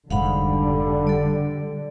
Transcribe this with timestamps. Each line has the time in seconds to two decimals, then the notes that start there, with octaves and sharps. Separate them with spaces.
0.10 F1 G#2 D3 G3 F5 F#5 B5
1.07 A4 D5